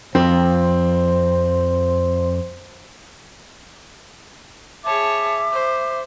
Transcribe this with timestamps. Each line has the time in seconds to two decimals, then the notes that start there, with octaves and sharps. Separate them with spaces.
0.15 F2 C4 C5
4.85 G#4 C#5 E5 A5 D6
5.54 C5